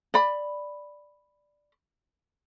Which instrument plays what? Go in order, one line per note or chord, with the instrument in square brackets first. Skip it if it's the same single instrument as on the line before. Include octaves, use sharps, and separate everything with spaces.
[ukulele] D5 B5